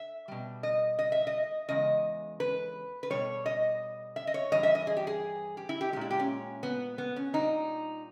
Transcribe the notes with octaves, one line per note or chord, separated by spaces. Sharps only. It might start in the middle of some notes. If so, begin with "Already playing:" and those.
Already playing: E5
B2 G3
D#5
D#5
E5
D#5
E2 C#3 G#3 D#5
B4
B4
B2 G3 C#5
D#5
E5
D#5
C#5
G2 E3 G3 D#5
E5
D#5
G#4
G4
G#4
G4
E4
G4
A#2 G#3 E4 G4
G4
C#4
B3
B3
C#4
A#2 G3 D#4